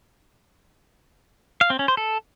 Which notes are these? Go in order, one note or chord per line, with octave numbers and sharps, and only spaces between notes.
F5
C4
C#4
C5
A4